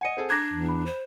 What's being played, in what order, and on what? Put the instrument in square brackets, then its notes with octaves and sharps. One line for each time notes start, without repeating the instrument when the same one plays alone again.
[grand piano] D#5 G#5 [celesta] F#5 C#7 D#7
[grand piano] C4 G#4 A4
[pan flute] D4 [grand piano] A#5 D6 F#6 [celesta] G#6 A#6
[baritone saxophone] E2
[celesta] B5
[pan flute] C5